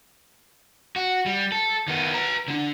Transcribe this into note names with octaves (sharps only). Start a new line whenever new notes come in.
F#4
G3
A4
D#3 B3
B4 A#5
D3 D4